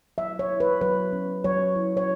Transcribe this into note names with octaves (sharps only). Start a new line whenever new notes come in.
F#3 E5
C#5
E4
B4
F#3 B4
C#4
F#3 C#5
E4
C#5